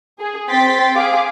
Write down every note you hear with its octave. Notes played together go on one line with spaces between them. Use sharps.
G#4
C4 G5 C6 A6 B6
G#4 F5 D6